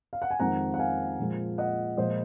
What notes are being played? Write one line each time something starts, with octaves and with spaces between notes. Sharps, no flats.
F5
F#5
G#5
F2 D#3 G#3 F#5 A#5
F#5
F5 G#5
A#2 F3 G#3
D#5 F#5
A#2 F3 G#3 C5 D#5